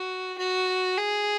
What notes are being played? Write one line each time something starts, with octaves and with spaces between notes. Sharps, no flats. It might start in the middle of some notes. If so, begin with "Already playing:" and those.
Already playing: F#4
F#4
G#4